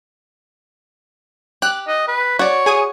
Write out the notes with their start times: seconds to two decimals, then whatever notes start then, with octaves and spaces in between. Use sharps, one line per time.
1.62 G4 F#6
1.88 D#5
2.08 B4
2.39 F#4 C#5 D5
2.66 G#4 G#5 D#6